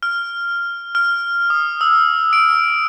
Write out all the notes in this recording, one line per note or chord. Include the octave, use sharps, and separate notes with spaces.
F6
F6
D#6
E6
D7